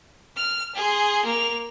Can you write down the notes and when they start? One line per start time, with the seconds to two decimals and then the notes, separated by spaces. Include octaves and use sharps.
0.36 F6
0.75 G#4 C6
1.25 A#3 F7